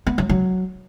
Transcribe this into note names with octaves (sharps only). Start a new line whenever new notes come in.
B3
F#3
F#3